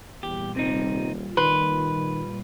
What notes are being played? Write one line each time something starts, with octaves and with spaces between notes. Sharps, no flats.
E2 A#2 G3 F4 G4
D#1 C3 C4 D#4
D#3 B4 C6